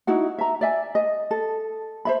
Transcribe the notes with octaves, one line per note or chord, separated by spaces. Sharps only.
D#4 E4 F#4 F#5
E5 A#5
D5 E5 G#5
D#5
A4
C5 E5 B5